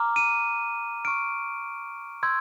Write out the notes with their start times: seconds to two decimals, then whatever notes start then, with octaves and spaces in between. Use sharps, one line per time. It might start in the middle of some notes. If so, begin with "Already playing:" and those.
Already playing: A#5 D6 F6
0.16 D#7
1.05 C#6 F6 D7
2.23 C6 E6 G6 G#6